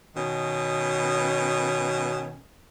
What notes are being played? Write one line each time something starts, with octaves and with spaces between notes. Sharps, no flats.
B2 D#3 C#4